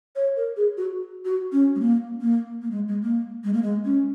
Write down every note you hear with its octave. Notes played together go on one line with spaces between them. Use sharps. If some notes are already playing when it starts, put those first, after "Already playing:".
C#5
A#4
G#4
F#4
F#4
C#4
G#3
A#3
A#3
A#3
G#3
G#3
A#3
G#3
A#3
G#3
C#4